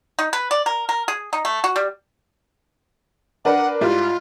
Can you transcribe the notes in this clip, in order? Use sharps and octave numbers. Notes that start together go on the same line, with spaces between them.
D#4
B4
D5
A#4
A#4
G#4
D#4
A3
F#4
G3
D4 A#4 B4 F#5
G#2 G3 E4 F4